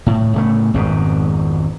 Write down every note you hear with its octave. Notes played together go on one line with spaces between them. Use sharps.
A2
A2 C#3 A3
G#1 F2 G#2 B2